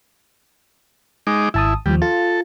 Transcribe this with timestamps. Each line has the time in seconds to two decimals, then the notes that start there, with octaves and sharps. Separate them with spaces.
1.27 G#3 D#4 D6
1.54 G#1 E4 A5 D#6
1.86 D#2 F3 G3
2.02 F4 A4